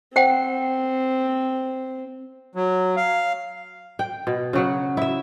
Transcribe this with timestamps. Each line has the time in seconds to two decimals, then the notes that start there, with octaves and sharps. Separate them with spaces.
0.16 C4 C5 F#5 G5
2.55 F#3
2.97 F5
3.99 G5
4.27 B2
4.53 C#3 F#3 F#5
4.97 E4 E5